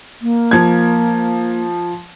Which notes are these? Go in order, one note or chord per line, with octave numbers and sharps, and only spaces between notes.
A#3
F3 G#6